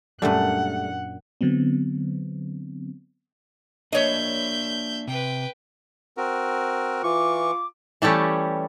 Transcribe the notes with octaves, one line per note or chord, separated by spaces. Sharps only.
F#2 A#2 G3 A3 D4 F#5
D3 F#3 B3 C4
A#3 D4 C#5 D#5 E5 G6
C3 B4 G5
C4 F#4 A#4
E3 F4 C#6 D6
E3 G3 A3 C#4 G4